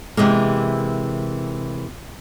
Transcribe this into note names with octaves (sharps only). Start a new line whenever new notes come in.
C3 E3 G#3 A#3